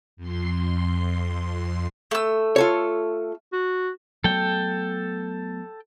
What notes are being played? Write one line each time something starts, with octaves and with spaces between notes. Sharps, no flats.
F2 C6
A3 E6
F4 A4 C#5
F#4
F#3 A3 B3 A4 G5